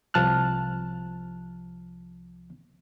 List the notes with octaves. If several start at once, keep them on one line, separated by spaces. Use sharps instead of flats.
C2 F3 A5 F6 F#6